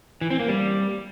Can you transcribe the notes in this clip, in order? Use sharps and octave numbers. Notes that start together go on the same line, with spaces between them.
E3
C4
A#3
G3